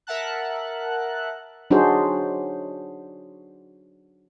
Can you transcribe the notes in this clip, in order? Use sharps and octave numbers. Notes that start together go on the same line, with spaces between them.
A#4 E5 F#5 A5 F#6
F#3 D4 D#4 F#4 G#4 C5